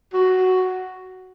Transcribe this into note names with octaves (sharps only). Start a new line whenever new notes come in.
F#4